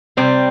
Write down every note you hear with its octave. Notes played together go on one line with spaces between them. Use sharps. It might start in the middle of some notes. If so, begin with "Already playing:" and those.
C3 G3 C4